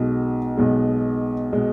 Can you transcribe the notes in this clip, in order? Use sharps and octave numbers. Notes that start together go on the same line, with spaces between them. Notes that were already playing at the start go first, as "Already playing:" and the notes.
Already playing: B1 B2 G#3
B1 B2 G#3
B2 G#3